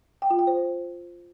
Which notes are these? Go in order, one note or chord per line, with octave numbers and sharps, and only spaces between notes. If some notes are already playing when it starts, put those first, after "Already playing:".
G5
F4
G5
C5